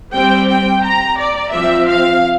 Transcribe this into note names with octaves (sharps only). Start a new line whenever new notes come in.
G3 C4 G5
G5
A#5
D5
F3 C4 E5
F5